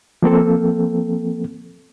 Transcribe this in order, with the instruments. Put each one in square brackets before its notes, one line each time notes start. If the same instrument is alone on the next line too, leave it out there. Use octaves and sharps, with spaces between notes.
[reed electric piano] F3 A#3 C4 A4